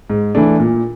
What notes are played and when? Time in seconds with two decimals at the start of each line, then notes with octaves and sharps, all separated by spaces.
0.10 G#2
0.35 E3 A3 D4
0.60 A#2